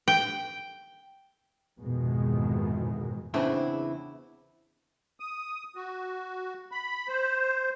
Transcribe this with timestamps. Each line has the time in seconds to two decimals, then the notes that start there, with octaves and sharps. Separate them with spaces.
0.08 G5
1.79 F2 G#2 B2 D#3 E3 G#3
3.34 E2 C#3 B3 C4 D4 E4
5.20 D#6
5.76 F#4
6.72 B5
7.08 C5